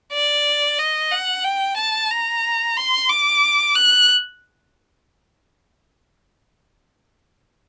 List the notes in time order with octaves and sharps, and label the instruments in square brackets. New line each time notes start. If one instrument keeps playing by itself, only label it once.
[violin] D5
D#5
F#5
G5
A5
A#5
C6
D6
F#6